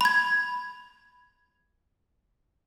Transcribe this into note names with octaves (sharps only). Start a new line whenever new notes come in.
B5 G#6